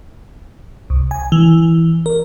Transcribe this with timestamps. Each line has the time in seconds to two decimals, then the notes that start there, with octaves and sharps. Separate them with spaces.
0.90 C2
1.11 G#5
1.32 E3
2.06 A#4